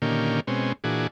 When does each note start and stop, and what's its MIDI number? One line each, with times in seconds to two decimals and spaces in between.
0.02 0.40 46
0.02 0.40 50
0.02 0.40 51
0.02 0.40 58
0.02 0.40 61
0.02 0.40 67
0.47 0.72 47
0.47 0.72 56
0.47 0.72 60
0.47 0.72 61
0.84 1.07 46
0.84 1.07 52
0.84 1.07 62
0.84 1.07 66
0.84 1.07 68